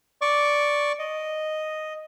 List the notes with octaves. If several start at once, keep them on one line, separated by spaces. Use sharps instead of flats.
D5 C#6 D6
D#5